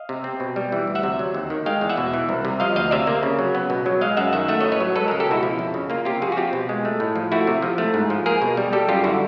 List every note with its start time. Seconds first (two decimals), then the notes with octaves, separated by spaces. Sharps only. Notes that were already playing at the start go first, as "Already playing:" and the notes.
Already playing: D#5 F5
0.09 C3
0.24 C4
0.40 B2
0.56 G3
0.72 E3
0.87 D2
0.95 E5 F#5
1.03 C3
1.19 F#3
1.35 D#2
1.50 D#3
1.66 G#3 F5 G5
1.81 E2
1.89 E5 F#5
1.97 B2
2.14 E3
2.29 C2
2.45 C3
2.60 F3 D#5 F5
2.76 D2 D#5 F5
2.91 C3 D5 E5
3.07 A#3
3.23 C#3
3.39 F#3
3.55 B3
3.70 B2
3.86 F#3
4.01 G#3 D#5 F5
4.17 F#2 E5 F#5
4.33 D#3 E5 F#5
4.48 A3 E5 F#5
4.60 A2 C#5 D#5
4.72 B4 C#5
4.81 F#3
4.96 G#3 A4 B4
5.08 C#2 G#4 A#4
5.20 G4 A4
5.27 B2 E4 F#4
5.43 F3 E4
5.59 F2
5.74 C#3
5.90 A#3 F4
6.05 C3 F4 G4
6.22 F3 F#4 G#4
6.32 F#4
6.37 C4 F4 G4
6.53 B2
6.69 G#3
6.85 A3
7.00 A2
7.16 F3
7.32 A3 E4 F#4
7.47 C3
7.62 F3
7.78 A3
7.94 G#2
8.10 F3
8.26 A#3 G#4 A#4
8.42 B2
8.57 G3
8.73 G3 G4 A4
8.89 F#2 F4 G4
9.04 D3 E4 F#4